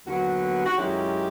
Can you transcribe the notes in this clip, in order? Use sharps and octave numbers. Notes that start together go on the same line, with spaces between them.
D#2 D3 F#3 B3 F#4
F#4
F#2 D#3 G#3 C#4 E4 G4